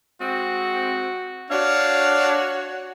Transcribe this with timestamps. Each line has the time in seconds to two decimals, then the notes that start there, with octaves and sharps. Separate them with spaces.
0.21 G#3 C4 F#4
1.51 D4 F#4 C#5 F5